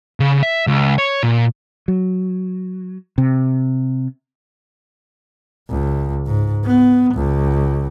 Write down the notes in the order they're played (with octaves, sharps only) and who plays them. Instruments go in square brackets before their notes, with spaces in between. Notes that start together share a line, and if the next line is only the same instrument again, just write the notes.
[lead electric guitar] C#3
E5
C#2
C#5
A#2
[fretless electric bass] F#3
C3
[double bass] C#2
G#2
B3
C#2